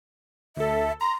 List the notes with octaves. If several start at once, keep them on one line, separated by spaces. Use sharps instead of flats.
D2 A4 E5
A#5 C6